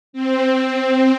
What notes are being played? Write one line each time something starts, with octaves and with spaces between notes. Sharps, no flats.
C4